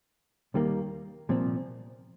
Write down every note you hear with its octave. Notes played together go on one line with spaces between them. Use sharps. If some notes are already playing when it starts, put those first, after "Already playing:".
D#2 D#3 G3 A#3
C2 A#2 F3 C4